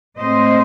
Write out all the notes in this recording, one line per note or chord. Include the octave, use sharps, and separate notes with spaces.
A2 G#3 C4 C5 D#5